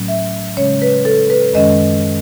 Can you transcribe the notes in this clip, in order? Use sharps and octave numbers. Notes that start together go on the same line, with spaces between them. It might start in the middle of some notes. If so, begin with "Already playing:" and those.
Already playing: A2 F#3 A3 C#4
E5
C#3 G#3 C#4 C#5
B4
A4
B4
F#2 D#3 G#3 C#4 D#5